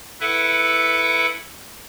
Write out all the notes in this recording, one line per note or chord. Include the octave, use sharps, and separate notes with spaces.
E4 A4 B4 E5 F#5